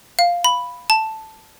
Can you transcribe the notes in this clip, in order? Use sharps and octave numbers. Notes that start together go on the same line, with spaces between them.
F5
B5
A5